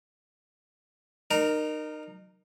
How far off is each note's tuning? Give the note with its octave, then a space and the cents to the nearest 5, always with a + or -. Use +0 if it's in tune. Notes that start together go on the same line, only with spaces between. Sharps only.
D#4 -30 A#4 +0